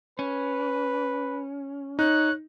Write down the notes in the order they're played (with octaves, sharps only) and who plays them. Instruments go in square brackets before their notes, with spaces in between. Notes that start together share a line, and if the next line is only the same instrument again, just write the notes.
[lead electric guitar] C#4 [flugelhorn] B4
[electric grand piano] D#4 [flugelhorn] C#5 [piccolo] F#6